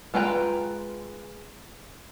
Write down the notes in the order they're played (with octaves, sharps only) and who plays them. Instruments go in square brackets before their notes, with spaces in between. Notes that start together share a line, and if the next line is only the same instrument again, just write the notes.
[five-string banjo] G#3 F4 B4 G5 A#5